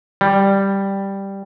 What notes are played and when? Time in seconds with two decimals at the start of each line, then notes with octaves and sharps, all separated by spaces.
0.21 G3